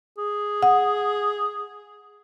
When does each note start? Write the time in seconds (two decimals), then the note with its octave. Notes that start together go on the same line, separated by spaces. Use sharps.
0.18 G#4
0.63 F#5